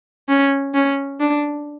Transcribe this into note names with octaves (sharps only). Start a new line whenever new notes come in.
C#4
C#4
D4